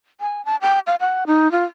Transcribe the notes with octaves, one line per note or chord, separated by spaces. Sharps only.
G#5
A5
G5
F5
F#5
D#4
F4